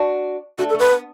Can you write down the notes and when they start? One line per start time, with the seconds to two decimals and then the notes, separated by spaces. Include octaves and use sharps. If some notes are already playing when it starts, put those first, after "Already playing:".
Already playing: D4 F#4
0.58 A3 D4 F#4
0.69 A4
0.74 A3 B4
0.91 B3